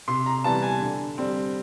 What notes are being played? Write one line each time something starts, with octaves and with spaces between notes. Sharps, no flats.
C3 C6
A#5
E3 G3 B3 A5
G#5
D3
G3 C4